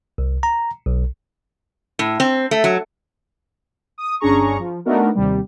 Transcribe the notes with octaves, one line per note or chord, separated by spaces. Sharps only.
C2
A#5
B1
A2
C4
A3
F#3
D#6
G1 C#4 D4 G#4 A#5 C#6
F3
A3 B3 D4 D#4 F#4 A#4
D#2 C3 G3